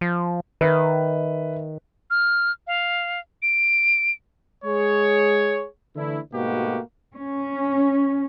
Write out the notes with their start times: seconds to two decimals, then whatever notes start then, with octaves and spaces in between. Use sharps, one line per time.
0.01 F3
0.61 D#3 B4 E5
2.10 F6
2.67 F5
3.42 D7
4.65 G#3 G#4 C#5
5.96 D3 E3 A3 D4 E4
6.34 G#2 B2 A3 A#3 F#4 G4
7.15 C#4